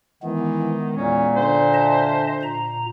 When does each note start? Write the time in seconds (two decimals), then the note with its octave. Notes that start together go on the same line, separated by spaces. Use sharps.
0.23 D#3 E3 G#3 B3
0.97 E2 A#2 C#4
1.36 D3 C5
1.74 D#5 E5 A5
2.42 A#2 A#5